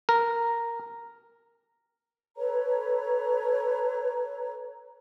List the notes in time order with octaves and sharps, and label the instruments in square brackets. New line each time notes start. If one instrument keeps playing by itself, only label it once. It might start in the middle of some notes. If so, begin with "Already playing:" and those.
[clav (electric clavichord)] A#4
[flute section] A4 B4 C#5 A#5